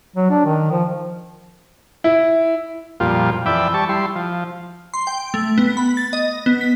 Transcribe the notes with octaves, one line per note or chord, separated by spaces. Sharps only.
F#3
D4
D#3
F3
E4
F2 A#2 G3 F4
F2 E3 D5 E5 G5 B5
G3 A5 C#6
G3 E4 C6
F3
C6
G5
A3
B3
B5
A6
D#5
B3
B6